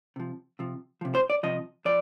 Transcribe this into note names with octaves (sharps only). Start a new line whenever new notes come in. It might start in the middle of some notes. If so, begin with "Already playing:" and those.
C3 F3
C3 F3
C3 F3
C5
D5
C3 F3 D#5
F3 D5